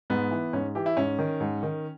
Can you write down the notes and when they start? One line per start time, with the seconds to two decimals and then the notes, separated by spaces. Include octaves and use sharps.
0.10 G#2 B3
0.31 E3
0.53 G#2 C#4
0.75 E3 G4
0.86 E4
0.97 G#2 C#4
1.19 D#3
1.40 G#2
1.63 D#3